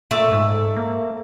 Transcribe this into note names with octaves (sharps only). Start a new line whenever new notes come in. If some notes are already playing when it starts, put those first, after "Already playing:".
A#2 A3 E5 D6
G#2
A#3